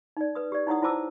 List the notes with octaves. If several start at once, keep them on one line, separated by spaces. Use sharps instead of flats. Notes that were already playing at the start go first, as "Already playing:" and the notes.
D#4 D5
B4 D#6
G4 D5
D#4 E4 C#5 F#5 D#6
E4 F4 C5 A5 D6 E6